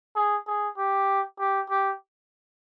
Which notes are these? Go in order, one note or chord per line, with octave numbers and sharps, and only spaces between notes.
G#4
G#4
G4
G4
G4